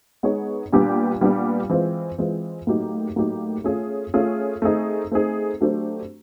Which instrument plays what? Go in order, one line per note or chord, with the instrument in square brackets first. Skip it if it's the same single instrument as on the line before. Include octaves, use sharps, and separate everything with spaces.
[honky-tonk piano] G#3 B3 D#4 G#4 C#5
A#2 G3 B3 D4 G4
A#2 G3 B3 D4 G4
E3 G#3 C4 F4
E3 G#3 C4 F4
A2 F#3 A#3 D#4 G4
A2 F#3 A#3 D#4 G4
A3 C#4 F4 G#4
A3 C#4 F4 G#4
A3 C4 D#4 G#4
A3 C4 D#4 G#4
F#3 A3 D4 G4 C5